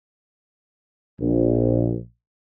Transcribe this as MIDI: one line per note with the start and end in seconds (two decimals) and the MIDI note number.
1.20 1.96 34